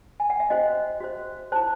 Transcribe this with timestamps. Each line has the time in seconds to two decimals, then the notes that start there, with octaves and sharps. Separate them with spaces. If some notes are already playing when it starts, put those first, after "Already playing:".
0.20 G#5
0.30 F#5
0.40 E5
0.50 C#4 F#4 C5 D#5
1.00 F#4 C5
1.52 E4 C5 A5